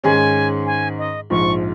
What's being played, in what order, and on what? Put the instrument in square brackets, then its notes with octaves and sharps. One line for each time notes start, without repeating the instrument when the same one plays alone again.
[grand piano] G#2 D#3 C#4 G#4 [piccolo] G#5
[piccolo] G#5
D#5
[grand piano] A#1 G#2 F3 [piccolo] C#6